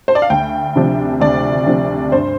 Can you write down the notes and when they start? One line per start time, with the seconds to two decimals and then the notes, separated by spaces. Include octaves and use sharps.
0.08 C5
0.15 D5
0.22 F5
0.30 D2 G5
0.76 C3 F3 D4
1.20 D2 D5
1.67 C3 F3 D4
2.12 G2 C5